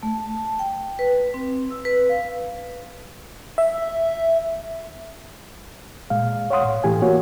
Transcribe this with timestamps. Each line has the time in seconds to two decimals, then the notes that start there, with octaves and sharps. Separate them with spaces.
0.03 A3
0.26 A5
0.59 G5
0.99 B4
1.34 C4
1.71 E6
1.85 B4
2.09 F5
3.58 E5
6.10 A#2 G#3 F5
6.50 C#5 F5 F#5 C6 D#6
6.63 A2
6.84 A2 E3 A3 G4 G#5
7.02 A#3 F#4 C#5